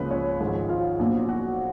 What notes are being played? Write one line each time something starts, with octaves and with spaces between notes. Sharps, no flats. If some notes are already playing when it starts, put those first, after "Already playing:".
Already playing: C#2 C#3 F3 A#3 C#4 B4
C#4 C#5
G#1 G#2 F3 G#3
F4 F5
A#1 A#2 F#3 B3
F#4 F#5